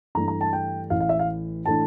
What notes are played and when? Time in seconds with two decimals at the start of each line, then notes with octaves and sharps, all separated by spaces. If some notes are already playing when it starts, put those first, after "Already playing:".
0.15 G2 E3 A3 D4 A#5
0.28 A#5
0.41 A5
0.53 G5
0.90 A1 A2 E3 F5
1.00 F5
1.09 E5
1.19 F5
1.66 A2 E3 A3 D4 A5